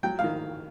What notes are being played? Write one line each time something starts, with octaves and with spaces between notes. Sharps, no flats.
F#3 G5
D#3 F5